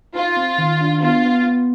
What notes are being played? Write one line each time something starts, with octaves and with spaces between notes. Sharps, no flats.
D#4 F4
C4
D#3
D4
B3 F4
B3
B3